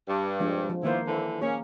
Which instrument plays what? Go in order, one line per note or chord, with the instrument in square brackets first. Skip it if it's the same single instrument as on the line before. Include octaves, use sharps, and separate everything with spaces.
[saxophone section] G2
[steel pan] F3 G#3 D4
F3
[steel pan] D#3 A#3 C5 [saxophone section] B3 E4 F4
[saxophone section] D3 E3
[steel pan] A#3 G#4 [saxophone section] C#4